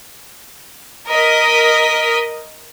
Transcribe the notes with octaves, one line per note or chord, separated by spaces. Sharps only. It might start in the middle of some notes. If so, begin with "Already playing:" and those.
A#4 D#5 B6